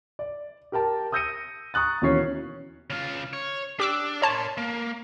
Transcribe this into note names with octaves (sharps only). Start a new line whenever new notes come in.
D5
G4 A#4 G5 A5
D#6 E6 G6 A#6 C#7 D#7
A#5 C#6 D#6 F#6 A6
D#2 B2 E3 C#4 C#5 C7
C#3 F4
C#5
D4 G4 D6 E6
A#4 C#5 A5 C6
A#3